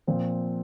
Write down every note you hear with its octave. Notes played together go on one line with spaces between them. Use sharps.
A#2 F3 C4